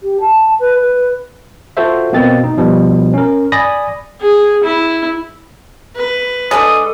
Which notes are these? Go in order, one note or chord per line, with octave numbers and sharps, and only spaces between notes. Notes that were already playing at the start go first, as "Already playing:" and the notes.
G4
A5
B4
B4
F4 F#4 A4 C5 E5
B2 A#3 C4 A6
D#4
B2 F3 G3
C#4 A#4
D5 G#5 B5 D#6 A#6
G#4
E4
B4
G#3 D4 A4 D#6